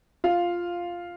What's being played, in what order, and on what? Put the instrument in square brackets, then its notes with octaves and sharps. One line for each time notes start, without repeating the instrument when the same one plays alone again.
[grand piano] F4 F5